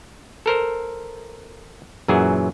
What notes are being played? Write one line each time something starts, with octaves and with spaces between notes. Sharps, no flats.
A4 A#4 C5
F#2 A#2 E3 F#3 G#4